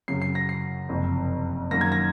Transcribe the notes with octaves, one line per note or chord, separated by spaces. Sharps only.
F#2 C#3 F#3 C7
C7
A#6
C7
F#1 F2 C3
F#2 D#3 A#3 A#6
G#6
A#6